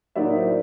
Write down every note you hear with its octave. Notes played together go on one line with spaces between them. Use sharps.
A2 F#3 A#3 D#4 D5 E5
C5 D5